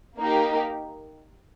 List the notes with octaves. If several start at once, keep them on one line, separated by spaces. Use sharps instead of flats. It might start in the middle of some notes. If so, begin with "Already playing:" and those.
A#3 D#4 G4